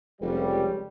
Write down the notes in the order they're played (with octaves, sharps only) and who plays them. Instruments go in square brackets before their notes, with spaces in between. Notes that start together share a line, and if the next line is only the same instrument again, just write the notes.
[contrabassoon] F1 [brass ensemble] C#2 G3